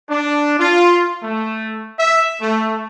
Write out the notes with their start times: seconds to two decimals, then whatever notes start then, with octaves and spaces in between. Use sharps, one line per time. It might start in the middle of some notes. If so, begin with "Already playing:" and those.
0.10 D4
0.58 F4
1.23 A3
2.00 E5
2.42 A3